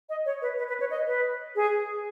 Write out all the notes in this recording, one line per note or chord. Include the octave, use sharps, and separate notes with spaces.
D#5
C#5
B4
B4
B4
C#5
D#5
B4
G#4